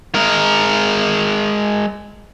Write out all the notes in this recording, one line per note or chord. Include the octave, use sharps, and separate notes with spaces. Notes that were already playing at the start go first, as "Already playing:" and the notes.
G#3 A#4